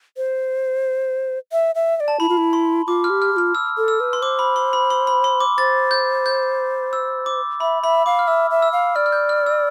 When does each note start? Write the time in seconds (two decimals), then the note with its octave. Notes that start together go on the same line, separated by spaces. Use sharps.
0.17 C5
1.52 E5
1.75 E5
1.97 E5
2.00 D5
2.08 A5
2.20 E4 B5
2.29 F4
2.37 E4
2.53 C6
2.87 F4 D6
3.04 F6
3.10 G4
3.22 F6
3.32 G4
3.37 F4 F6
3.55 E6
3.77 A4
3.88 E6
4.00 B4
4.13 C6
4.22 C5 D6
4.39 B5
4.56 C6
4.73 B5
4.90 C6
5.07 B5
5.24 C6
5.40 D6
5.58 C5 A6
5.91 G6
6.26 G6
6.93 E6
7.26 D6
7.60 E5 B5
7.83 E5 B5
8.06 F5 D6
8.19 F6
8.27 E5 E6
8.51 E5
8.62 E6
8.73 F5
8.96 D5 F6
9.06 F6
9.12 G6
9.29 F6
9.46 E6